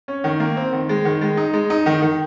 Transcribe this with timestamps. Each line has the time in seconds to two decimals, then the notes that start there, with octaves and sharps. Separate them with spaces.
0.08 C#4
0.24 D#3
0.40 A#3
0.57 C4
0.73 D#3
0.89 G#3
1.05 D#3
1.21 G#3
1.37 D#4
1.53 G#3
1.70 D#4
1.86 D#3
2.02 D#3